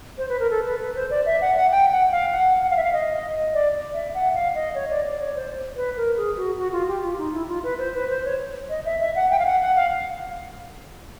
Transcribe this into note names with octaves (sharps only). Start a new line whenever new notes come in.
C5
B4
A#4
A4
B4
B4
C5
D5
E5
F#5
F#5
G5
F#5
F5
F#5
F#5
F5
E5
F5
D#5
D5
E5
F#5
F5
D#5
C#5
D5
D5
C#5
C5
B4
A#4
G#4
F#4
F#4
F4
G4
F4
D#4
E4
F4
B4
C5
B4
C5
C#5
D#5
E5
E5
F#5
G5
F5
F#5
F#5
F5